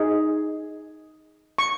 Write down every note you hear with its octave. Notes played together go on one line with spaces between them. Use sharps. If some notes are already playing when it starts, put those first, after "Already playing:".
Already playing: D#4 G#4
C#6